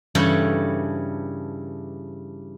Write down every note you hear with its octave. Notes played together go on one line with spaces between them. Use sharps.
G2 C#3 E3 G3 A4 C#5